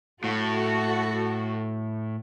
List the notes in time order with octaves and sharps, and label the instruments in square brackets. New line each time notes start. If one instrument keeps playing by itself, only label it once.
[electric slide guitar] A2 [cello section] F#4 A4